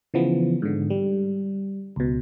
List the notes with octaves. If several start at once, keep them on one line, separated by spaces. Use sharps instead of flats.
C#3 E3 F3 B3
G#2 D3
G3
C#2 B2